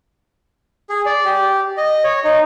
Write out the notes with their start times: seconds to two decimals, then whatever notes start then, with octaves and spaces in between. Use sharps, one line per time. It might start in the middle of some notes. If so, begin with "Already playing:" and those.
0.90 G#4
1.06 D5
1.25 G4
1.77 D#5
2.04 C#5
2.25 D#4